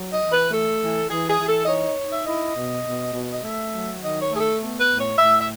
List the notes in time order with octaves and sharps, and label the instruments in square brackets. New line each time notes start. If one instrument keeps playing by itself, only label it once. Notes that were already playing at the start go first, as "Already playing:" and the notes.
Already playing: [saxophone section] F#3
D#5
E3
B4
A3 A4
E3
E3 G#4
G#4
E3
A4
D#5
D#4 C#5
D#4
E5
E4 D#5
B2
B2
B2
D#5
A3 E5
F#3
D#3 D#5
C#5
A3 G#4
A4
B3
B4
A2
C#5
A2 E5
E5